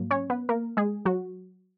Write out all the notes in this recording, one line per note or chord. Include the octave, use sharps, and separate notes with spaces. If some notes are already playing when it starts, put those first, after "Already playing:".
Already playing: G#2 F#3 A#3
C#4 C#5
B3 B4
A#3 A#4
G#3 G#4
F#3 F#4